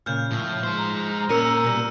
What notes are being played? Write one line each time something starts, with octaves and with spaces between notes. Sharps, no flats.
A#2 C#3 F6 G6
A2 F3
G#3 C5
A#5
A#2 C#4 A#4 E6 C#7 D#7
B2 G3